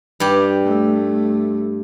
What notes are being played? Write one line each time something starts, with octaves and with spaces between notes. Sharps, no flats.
G2 G4
A3